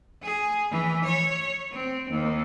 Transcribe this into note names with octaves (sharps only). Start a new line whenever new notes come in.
G#4
E3
C#5
C4
D#2